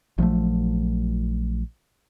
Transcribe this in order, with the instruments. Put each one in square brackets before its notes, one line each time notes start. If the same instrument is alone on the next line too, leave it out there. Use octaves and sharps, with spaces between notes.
[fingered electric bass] A#1 F3 F#3 A3